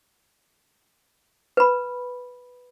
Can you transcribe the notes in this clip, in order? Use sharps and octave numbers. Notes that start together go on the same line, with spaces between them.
B4 B5